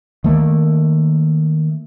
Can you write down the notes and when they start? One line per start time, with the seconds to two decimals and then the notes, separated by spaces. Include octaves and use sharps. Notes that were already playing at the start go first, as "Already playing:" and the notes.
0.24 D#3 A3 A#3